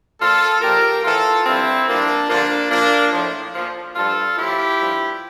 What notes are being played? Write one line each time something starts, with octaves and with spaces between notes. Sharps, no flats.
A#2 F3 F4 A4
A#2 F3 G4 A#4
A2 E3 F4 A4
G2 F3 C4 E4
G2 F3 A#3 D4
G2 D3 F3 A#3 D4
A#2 F3 A#3 D4
A2 F3
A#2 F3
G2 F3 F4 A4
A2 F3 E4 G4
G2 F3